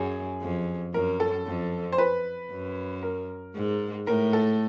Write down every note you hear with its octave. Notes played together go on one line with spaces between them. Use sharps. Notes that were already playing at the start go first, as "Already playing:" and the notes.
Already playing: F#2 G#4
F2
F#2 A#4
A4
F2
C5
B4
F#2
A#4
G#2
A2 A#4
A4